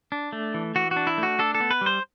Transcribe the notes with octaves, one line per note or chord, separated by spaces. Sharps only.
D4
A3
E3
E3 F#4
F#4
D4
E4
A3
F#4
D4 A4
A4
B3
B4
G3
C5